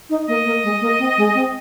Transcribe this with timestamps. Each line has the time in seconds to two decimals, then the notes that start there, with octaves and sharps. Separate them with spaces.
0.10 D#4
0.28 A#3 D#5
0.45 A#3
0.63 G#3
0.81 A#3
0.99 C4
1.17 G#3
1.34 C4